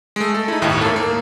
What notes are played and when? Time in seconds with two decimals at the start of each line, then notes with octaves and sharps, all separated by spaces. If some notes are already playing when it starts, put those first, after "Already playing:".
0.16 G#3 A3
0.34 A4
0.48 D#4 E4
0.62 G1 D#2 A2
0.81 A#3 A4
0.96 A#3